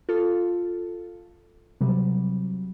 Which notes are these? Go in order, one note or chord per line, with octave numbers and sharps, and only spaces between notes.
F4 A4
C3 F#3 G3